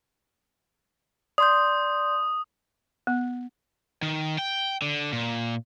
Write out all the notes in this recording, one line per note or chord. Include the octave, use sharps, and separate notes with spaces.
D5 C6 D#6 G6
B3
D#3
G5
D3
A#2